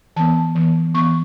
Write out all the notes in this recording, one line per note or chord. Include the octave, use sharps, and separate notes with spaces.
E3 B3 A5
E3 B3
E3 B3 C#6